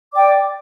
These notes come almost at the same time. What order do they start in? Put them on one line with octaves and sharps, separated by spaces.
D6 D5 G5